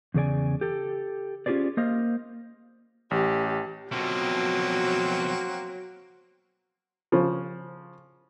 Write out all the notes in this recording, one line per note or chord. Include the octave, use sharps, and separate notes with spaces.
E2 C#3 G#4 D5 G#5
G4 A4
C#4 F4 G4 G#4 C5 D5
A#3 C5 D#5 F5
A1 G4
F2 B2 F#3 A#3 C4 F#4
C#3 F3